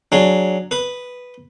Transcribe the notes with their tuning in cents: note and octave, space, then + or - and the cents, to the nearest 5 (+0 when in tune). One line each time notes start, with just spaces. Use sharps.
F#3 +0 D4 +0 G#4 +0
B4 +0 D#6 +0